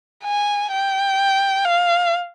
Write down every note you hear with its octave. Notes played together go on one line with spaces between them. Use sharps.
G#5
G5
F5